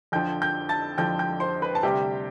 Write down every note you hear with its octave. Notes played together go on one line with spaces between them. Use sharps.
F2 D3 F3 G5 G6
G5 G6
A5 A6
F2 D3 F3 G5 G6
G5 G6
C5 C6
B4 B5
A5
D2 C3 G3 G4 G5